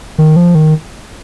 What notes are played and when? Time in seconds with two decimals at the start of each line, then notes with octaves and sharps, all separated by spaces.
0.18 D#3
0.36 F3
0.55 D#3